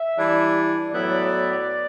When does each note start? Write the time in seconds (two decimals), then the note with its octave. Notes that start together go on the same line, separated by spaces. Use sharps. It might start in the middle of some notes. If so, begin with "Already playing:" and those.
Already playing: E5
0.17 E3 G3 D4
0.92 A2 F#3 B3 E4 D5